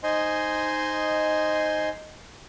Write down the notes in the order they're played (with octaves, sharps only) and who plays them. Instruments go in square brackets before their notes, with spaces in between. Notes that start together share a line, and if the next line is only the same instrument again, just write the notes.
[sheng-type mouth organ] D#4 C5 D#5 G#5 C6